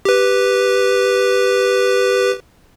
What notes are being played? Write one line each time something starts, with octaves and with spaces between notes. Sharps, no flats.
G4 B4